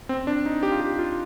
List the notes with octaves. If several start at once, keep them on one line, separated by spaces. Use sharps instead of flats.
C4
D4
D#4
G4
F4
G4
F4